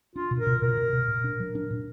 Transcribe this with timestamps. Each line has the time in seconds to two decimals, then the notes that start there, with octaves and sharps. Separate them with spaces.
0.16 D4 F4
0.31 B2
0.39 A#4
0.47 B2
0.62 B2 A#4
0.77 B2
0.93 B2
1.08 A#2
1.24 D4
1.40 F#3
1.55 D4
1.71 A#2